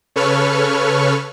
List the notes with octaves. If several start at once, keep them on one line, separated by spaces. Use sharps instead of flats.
C#3 A4 B4 C#5 C#6 F6